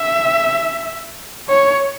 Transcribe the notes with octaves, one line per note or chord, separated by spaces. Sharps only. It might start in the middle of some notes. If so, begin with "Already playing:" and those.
Already playing: E5
C#5